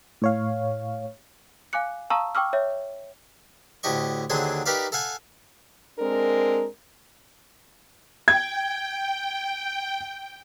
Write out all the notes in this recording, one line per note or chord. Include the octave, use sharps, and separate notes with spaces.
A2 C#5 F5
F5 G#5 D6 F#6 C#7
F5 A5 A#5 C#6 D#6 E6
G5 C#6 D6 E6 F6
C#5 E5
D2 A2 G4 D#5 C#6
D#2 D3 F#3 C4 G#4 C6
D#4 G4 A#4 B4 D5 F5
A4 F5 F#5 G#5
G#3 C4 D4 A#4
G5 G#6